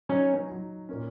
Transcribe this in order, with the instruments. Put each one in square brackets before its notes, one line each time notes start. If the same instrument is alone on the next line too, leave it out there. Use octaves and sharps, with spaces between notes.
[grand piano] F#3 D#4 [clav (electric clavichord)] C#4
[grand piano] F#3 D#4
A#2 A#3 C#4